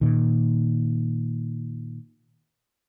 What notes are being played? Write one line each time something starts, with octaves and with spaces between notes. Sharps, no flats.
A#2 D#3